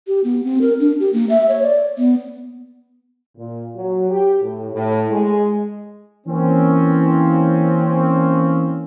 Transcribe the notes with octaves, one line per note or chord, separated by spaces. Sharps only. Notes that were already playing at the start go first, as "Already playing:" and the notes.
G4
B3
C4
A#4
D4
G4
A#3
E5
C#5
D5
B3
A#2
F#3
G4
A2
A2
G#3
E3 A#3 C4 C#4